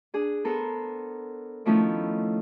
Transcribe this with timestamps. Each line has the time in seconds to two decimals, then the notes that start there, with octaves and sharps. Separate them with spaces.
0.14 D4 G#4
0.45 B3 A4 A#4 C5
1.66 D#3 F3 A3 B3 C#4 E4